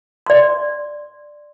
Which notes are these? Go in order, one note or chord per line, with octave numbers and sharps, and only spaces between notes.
D5 C6